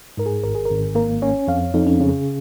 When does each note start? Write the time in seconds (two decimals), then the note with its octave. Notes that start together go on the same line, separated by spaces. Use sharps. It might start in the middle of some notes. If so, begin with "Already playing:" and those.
0.17 G#2 A#4
0.26 G#4
0.43 G#1 A#4
0.55 G#4
0.65 A#4
0.70 G#1
0.95 A#3 A#4
1.22 C#4 C#5
1.48 F2 F5
1.74 F2 D#4
1.87 C#4
2.00 C#3 C#4